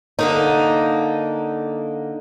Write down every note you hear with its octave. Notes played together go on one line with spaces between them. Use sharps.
D3 A#3 D#4